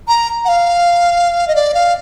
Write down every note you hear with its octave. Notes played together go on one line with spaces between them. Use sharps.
A#5
F#5
F5
D#5
D5
F5